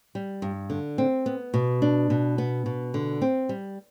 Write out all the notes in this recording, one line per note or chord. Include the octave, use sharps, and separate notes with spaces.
G3
G2
D3
C4
B3
B2
D4
B2
B3
B2
D3
C4
G3